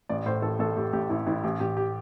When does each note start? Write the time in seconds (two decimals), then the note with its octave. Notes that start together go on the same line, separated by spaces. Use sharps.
0.09 A1 D5
0.26 A2 C5
0.42 A1 A4
0.59 A1 A4
0.76 A2 G4
0.93 A1 G4
1.09 A1 E4
1.26 A1 E4
1.43 A1 G4
1.60 A1 G4
1.77 G4